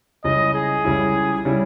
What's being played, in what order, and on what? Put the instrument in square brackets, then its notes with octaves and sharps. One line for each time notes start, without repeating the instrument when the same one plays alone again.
[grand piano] C#2 C#3 G3 C#4 E4 [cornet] D#5
[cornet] G#4
[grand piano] C#2 C#3 G3 C#4 E4
C#3 G3 C#4 E4